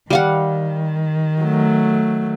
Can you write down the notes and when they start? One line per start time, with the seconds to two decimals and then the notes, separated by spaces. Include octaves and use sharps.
0.10 D#3 G3 F5 F#5
1.42 F#3 A3